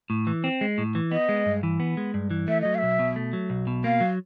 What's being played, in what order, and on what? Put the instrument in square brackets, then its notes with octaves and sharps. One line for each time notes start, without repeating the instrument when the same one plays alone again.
[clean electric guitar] A2
E3
C4
G#3
A2
E3
[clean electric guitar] B3 [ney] D#5
[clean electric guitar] G#3
G2
E3
B3
G#3
G2
E3
[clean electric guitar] A3 [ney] E5
[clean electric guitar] F#3 [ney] D#5
[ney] F5
[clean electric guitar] B1 [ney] E5
[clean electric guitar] B2
A3
F#3
B1
B2
[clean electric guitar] A#3 [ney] F5
[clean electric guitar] F#3